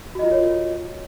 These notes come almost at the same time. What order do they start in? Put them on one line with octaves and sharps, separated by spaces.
F#4 D#5 F4 A#4 C#5